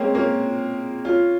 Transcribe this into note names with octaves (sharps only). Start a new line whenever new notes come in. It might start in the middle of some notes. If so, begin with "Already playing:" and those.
Already playing: G#3 A#3 C4 C#4
A#3 C#4
C#4 F4